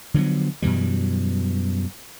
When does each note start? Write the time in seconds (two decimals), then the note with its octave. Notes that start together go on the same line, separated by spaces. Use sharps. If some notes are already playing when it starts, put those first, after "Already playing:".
0.14 D3 F3 F#3 B3
0.62 F#2 B2 E3 G3